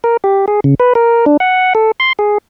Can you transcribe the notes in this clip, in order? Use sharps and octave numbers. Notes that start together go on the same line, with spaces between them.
A#4
G4
G#4
C#3
B4
A#4
D4
F#5
A4
C6
G#4